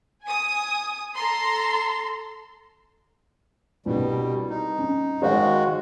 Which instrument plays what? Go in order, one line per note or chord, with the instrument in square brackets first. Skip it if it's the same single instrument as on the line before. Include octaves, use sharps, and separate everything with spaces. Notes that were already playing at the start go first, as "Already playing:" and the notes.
[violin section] G#5 D#6
A4 A#5 C6
[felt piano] C2 D4 B4 [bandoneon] B2 G3
[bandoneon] D#4
[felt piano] C#4
[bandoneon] D#3 G#3 F#4 [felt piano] C5 C#5 F5